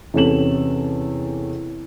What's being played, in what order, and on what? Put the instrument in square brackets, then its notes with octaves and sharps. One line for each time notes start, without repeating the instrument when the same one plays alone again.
[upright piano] E2 C3 C#4 A4 E7 F#7